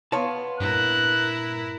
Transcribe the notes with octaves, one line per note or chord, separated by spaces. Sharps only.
B3 C#5 F5 A5 C6
G2 A#2 E4 A#4 F#6